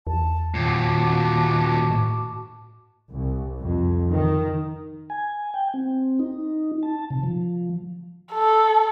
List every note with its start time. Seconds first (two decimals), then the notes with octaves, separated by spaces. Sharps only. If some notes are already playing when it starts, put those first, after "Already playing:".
0.07 E2 A5
0.54 D#2 A#2 F#4 A5 D6
1.91 A2
3.11 C2
3.61 F2
4.12 D#3
5.10 G#5
5.54 G5
5.74 C4
6.19 D#4
6.83 A5
7.10 C3
7.23 F3
8.32 A4